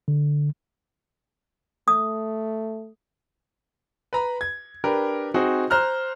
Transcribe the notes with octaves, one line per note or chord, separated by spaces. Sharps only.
D3
A3 D#6
B4 A#5 B5
G#6
D4 G4 A#4 B4
C4 D#4 F#4 G#4
C5 A#5 F6 F#6